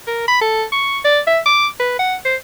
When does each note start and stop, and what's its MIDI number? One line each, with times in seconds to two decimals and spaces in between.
0.07 0.23 70
0.28 0.41 83
0.41 0.65 69
0.72 0.99 85
1.04 1.20 74
1.27 1.40 76
1.46 1.67 86
1.80 1.95 71
1.99 2.15 78
2.25 2.36 72